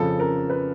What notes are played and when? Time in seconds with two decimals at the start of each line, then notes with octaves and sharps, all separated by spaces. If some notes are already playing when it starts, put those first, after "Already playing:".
Already playing: F2 C#3 F3 A4
0.20 A#4
0.50 B4